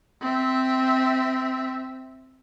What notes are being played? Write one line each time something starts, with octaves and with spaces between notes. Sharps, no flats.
C4 E5